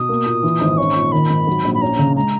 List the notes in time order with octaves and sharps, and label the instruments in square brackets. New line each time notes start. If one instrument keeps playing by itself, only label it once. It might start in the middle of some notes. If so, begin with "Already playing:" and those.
Already playing: [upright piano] B2 [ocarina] D#6
[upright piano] A#3
A#2
E3
G#1
[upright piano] C#4 [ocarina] C#6
[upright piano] A#2
[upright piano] D#3 [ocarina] B5
[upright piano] G#1
F#3
A#1
[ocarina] B5
[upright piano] C#4 [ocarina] A#5
[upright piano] C#3
[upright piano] G#3 [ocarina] A#5